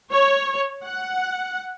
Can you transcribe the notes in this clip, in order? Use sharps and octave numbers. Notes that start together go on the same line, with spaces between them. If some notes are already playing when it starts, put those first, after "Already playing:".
C#5
F#5